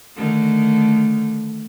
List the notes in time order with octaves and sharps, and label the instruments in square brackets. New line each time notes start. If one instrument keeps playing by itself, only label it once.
[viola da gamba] D3 D#3 A3